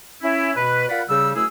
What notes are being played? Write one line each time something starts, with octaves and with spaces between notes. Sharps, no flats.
C#4 E4
B2 B4
F4 A#4 D5 F#5 B5
C#3 G3 E6
F#2 A3 E4 G#4 E6